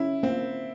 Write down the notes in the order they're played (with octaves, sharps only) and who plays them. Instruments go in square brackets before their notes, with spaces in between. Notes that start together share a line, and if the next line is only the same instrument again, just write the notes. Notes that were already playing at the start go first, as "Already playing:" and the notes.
Already playing: [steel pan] C#4 [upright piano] E4
[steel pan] A#3 [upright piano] C4